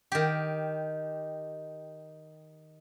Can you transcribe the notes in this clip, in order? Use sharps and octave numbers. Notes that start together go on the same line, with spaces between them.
D#3 G4